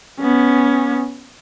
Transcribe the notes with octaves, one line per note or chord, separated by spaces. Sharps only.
B3 C#4